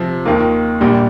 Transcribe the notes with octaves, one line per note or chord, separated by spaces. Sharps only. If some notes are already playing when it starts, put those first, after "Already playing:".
Already playing: C3 F3 C4
D#2 D#3 A#3 F4
A#1 A#2 G3